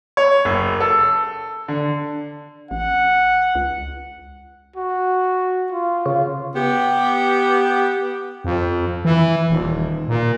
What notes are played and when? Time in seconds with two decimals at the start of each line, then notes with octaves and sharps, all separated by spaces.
0.17 C#5
0.45 F#1
0.80 A4
1.68 D3
2.71 A1 F#5
3.55 C#2
4.76 F#4
5.72 F4
6.06 C#3
6.56 B3 G4
8.45 F2
9.05 E3
9.50 D#1
10.08 A#2